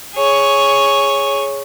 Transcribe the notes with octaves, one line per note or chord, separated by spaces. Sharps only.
G#4 C#5